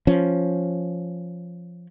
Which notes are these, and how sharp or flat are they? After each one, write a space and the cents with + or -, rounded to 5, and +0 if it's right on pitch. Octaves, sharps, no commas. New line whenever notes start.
F3 +0 C#4 +0